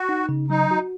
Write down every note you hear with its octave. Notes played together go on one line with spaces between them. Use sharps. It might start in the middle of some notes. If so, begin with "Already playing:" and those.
Already playing: F#4
D#4
C#3
F#3 D#4
F#4